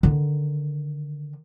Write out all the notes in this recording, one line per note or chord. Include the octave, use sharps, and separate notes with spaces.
D3 D#3